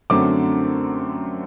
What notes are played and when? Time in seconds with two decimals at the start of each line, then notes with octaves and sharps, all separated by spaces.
0.10 F#2 D3 F#3 A3 C4 D6